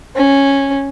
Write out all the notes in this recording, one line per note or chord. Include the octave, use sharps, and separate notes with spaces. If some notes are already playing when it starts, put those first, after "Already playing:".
C#4